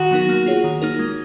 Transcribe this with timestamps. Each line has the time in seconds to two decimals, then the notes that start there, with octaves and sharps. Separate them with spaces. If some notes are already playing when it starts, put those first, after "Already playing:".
Already playing: D#3 F#4
0.11 F#3 B3 D#4 A#4
0.29 A#3
0.46 F4 G#4 C#5
0.64 D#3
0.82 A#3 D#4 A#4
0.99 G#3